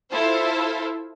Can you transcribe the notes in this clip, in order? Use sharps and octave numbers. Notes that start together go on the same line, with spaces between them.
E4 F4 A4 C5